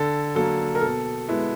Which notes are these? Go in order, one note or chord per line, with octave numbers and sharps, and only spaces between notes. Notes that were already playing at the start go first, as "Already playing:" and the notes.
Already playing: D3 A4
F#3 A#3 A4
A#4
B2 A4
G#3 B3 E4